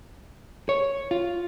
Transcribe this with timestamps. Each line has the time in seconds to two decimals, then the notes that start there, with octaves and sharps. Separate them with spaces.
0.69 C#5
1.11 F4